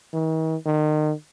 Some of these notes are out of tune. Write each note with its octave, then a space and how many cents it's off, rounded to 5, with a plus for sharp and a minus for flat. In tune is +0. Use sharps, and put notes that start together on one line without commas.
D#3 +45
D#3 -30